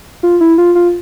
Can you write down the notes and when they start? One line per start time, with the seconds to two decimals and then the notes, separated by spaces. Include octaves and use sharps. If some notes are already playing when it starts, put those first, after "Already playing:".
0.23 F4
0.41 E4
0.58 F4
0.75 F4